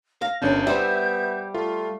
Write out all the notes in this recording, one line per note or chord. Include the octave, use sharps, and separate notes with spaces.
F5 A#6
G1 D#2 C#4 D4 G6
G3 B3 C5 E5
A3 F4